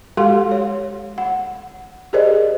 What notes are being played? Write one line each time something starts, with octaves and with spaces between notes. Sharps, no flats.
G#3 F#4 G4 A4 F5 C6
C#5
F#5
G4 G#4 A#4 C5 D5 D#5